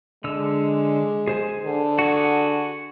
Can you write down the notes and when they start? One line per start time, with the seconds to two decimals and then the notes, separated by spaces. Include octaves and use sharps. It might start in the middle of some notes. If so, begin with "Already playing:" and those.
0.24 D3 G#3 E6
1.28 G#4 C5 G#5
1.65 D3
1.99 F#4 G#4